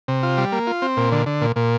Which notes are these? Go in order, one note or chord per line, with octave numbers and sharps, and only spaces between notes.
C3
F4
G3
A#3
F4
C4
A#2
D3
D3
A#2
A#2